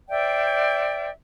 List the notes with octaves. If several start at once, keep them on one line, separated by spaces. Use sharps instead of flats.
C5 D5 E5 G5